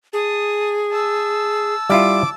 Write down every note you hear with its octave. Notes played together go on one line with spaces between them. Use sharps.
G#4 A5 D#6
A5 E6
G3 E4 F4 D6